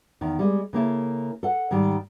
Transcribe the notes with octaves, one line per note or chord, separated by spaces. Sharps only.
E2 D#3
G3 G#3 D#5
C#3 A#3 E4 A4
A4 F#5
G#2 D#3 G3